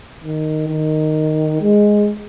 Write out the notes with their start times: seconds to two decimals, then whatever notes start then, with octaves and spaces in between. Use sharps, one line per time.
0.24 D#3
0.69 D#3
1.61 G#3